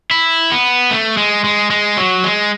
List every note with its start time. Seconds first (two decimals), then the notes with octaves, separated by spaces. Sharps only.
0.11 E4
0.52 B3
0.91 A3
1.17 G#3
1.44 G#3
1.70 G#3
1.97 F#3
2.24 G#3